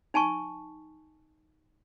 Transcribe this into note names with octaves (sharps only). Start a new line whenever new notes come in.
D#4 G#5 A5 C#6